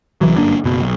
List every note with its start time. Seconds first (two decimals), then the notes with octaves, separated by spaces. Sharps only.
0.21 C2 E3 F#3
0.37 G1 F#2 A#3 D4
0.64 F#1 B2
0.81 B1